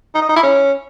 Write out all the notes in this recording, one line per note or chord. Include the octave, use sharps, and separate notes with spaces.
D#4
D#5
D#4
E4
C#4